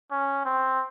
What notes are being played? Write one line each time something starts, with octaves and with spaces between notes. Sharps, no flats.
C#4
C4